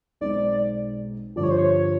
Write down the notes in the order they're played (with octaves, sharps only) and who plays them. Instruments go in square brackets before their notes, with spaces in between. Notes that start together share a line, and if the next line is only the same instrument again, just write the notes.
[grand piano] B1 B2 G#3 C4 D#4 [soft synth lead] D5
[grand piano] G2 D3 F3 [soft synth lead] D5
[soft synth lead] C#5
C5
C#5